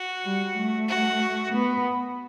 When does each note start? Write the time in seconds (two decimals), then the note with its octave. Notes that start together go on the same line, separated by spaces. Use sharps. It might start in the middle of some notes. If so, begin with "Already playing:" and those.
Already playing: F#4
0.24 G3
0.57 A3
0.88 F#4
1.52 B3